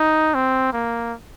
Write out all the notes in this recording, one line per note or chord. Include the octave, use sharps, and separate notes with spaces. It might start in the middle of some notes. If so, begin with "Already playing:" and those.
Already playing: D#4
C4
A#3